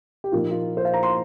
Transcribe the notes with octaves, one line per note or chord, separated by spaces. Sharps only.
G4
A#2 F3 A#3 D#4 F4
F4
C5
F5
A#5
C6